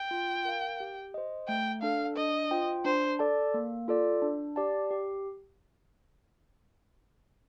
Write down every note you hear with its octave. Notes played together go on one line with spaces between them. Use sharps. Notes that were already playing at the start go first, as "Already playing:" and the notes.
Already playing: G5
F4
A#4 F5
G4
C5 D#5
A3 G5
D4 A4 F5
D4 D#5
F4 C5 G5
D4 C5
A4 D5 A5
A#3
F4 A4 D5
D4
G4 D5 A5
G4